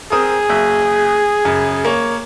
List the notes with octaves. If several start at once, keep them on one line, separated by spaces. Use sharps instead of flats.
C4 G#4 A#4 D#6
F#1 E5
F#2 C#3
A#3 C#5